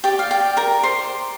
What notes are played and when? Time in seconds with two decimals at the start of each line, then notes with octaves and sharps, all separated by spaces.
0.04 G4 D5 G5
0.19 F5
0.31 G5
0.57 A#4 A#5
0.83 C5 C6